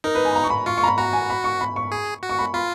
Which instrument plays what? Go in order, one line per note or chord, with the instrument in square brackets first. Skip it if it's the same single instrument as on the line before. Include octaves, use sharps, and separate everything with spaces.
[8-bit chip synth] D#4 [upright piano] A#4
[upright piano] B4
G#5
B5
A#5
C#6
B5
[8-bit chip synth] F4 [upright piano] C#6
[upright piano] C#6
A#5
B5
[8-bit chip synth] F#4 [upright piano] A#5
[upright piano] G#5
B5
C#6
B5
C#6
[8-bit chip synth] G#4
F#4
[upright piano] C#6
B5
[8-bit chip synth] F4 [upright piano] B5